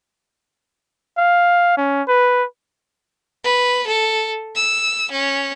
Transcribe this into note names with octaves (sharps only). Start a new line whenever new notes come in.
F5
C#4
B4
B4
A4
E6
C#4